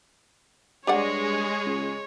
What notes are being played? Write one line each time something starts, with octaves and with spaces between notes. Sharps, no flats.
G2 G#3 G4 G#4 C#5 D5 F#5
C#2